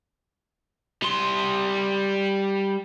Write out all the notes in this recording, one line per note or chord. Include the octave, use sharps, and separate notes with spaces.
G3 C6